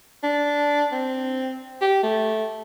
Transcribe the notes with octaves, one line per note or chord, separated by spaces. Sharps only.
D4
C4
G4
A3